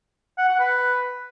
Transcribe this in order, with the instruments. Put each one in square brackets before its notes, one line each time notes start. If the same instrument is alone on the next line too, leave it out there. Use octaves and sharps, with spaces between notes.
[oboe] F#5
F#5
B4